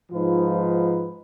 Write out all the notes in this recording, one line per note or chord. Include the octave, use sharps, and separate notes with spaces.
G#2 F3 D#4 F4 B4